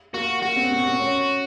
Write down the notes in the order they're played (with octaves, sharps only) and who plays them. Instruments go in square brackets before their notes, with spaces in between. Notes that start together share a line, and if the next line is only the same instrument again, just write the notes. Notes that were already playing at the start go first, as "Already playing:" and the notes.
[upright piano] A#3 [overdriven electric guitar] F#4
[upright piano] A#3 [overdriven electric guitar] F#4
[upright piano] C4
C4
C4
C#4